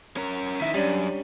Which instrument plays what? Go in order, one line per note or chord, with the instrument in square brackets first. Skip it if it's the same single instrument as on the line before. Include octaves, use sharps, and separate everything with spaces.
[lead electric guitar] C#4 A#4
[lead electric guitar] D#3 E4 [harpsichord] D#5 E5 B5
[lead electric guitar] F#2 [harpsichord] G3 C#4 D4